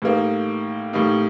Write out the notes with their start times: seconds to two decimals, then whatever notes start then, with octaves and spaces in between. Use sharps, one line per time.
0.02 A2 G3 A#3 D#4
0.93 A2 G3 A#3 D#4